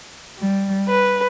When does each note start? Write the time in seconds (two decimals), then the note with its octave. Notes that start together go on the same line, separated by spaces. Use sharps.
0.38 G3
0.88 B4